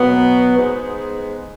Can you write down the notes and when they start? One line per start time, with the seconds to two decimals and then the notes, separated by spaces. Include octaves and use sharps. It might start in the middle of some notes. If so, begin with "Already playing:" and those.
Already playing: B2 F#3 B3
0.57 G#3 B3 D#4 G#4 C5